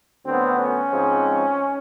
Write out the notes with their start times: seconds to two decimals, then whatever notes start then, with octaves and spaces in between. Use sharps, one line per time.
0.24 D2 D3 F#3 B3 C4
0.58 C#4
0.91 G#2 F3 G#3 C4